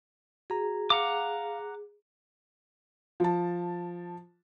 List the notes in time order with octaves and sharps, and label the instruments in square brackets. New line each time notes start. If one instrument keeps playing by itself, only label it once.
[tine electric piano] F#4 A#5 [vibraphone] G#4
[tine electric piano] F5 [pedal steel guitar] F#5 A#5 D6
[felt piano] F3 A5